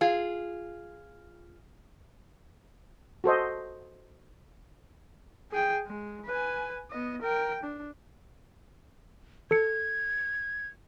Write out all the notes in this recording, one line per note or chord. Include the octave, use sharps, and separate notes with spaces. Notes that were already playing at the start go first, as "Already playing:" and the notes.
F4 G#4
F#4 A4 C5 D#5
G#4 G5
G#3
B4 G#5
B3 D#5
A#4 G5
D4
A4 G#6 C#7